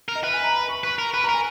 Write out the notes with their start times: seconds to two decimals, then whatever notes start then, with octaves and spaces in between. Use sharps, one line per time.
0.08 A#4
0.15 D#5
0.24 B4 E5
0.33 G#5
0.44 A#5
0.54 B5
0.69 C#6
0.84 B4 C#6
0.98 A#4
1.14 B4 B5
1.24 A#5
1.29 A#4 G#5